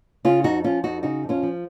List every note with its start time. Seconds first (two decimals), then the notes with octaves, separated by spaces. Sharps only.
0.25 C#3 C#4 F4
0.44 F2 D#4 F#4
0.64 F3 C#4 F4
0.84 F2 D#4 F#4
1.03 C#3 D#4 F#4
1.23 F2
1.29 C#4 F4
1.43 F3